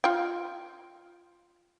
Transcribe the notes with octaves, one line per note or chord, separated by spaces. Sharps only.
F4 G5